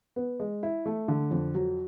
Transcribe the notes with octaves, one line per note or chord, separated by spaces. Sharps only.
B3
G#3
E4
A3
D3
F2
F#3